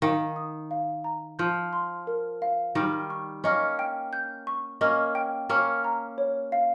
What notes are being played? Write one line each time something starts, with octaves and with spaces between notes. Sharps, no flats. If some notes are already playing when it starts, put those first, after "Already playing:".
D#3 F5
D#6
F5
A#5
F3 G6
C6
A#4
F5
D#3 G3 F6
C#6
A#3 C#4 D#5
G5
G6
C#6
A#3 C#4 D#5
G5
A#3 C#4 F6
A#5
C#5
F5